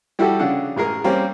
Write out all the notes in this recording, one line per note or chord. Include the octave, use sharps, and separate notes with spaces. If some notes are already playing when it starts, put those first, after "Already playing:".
G3 E4 F#4 G4 A4
C#3 D4 F#5
A1 G#3 G#4 A#4
G3 A#3 C4 C#4 G4